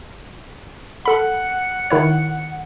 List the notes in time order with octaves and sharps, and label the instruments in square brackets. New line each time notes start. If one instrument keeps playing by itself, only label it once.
[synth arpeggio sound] A4 B5 [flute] F#5
[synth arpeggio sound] D#3 E4 C#5